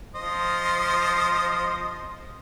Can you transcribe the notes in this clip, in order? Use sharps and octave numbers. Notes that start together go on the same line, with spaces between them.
F3 C5 D#5